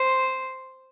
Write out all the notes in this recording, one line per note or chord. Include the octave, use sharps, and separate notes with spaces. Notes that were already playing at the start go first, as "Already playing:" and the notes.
Already playing: C5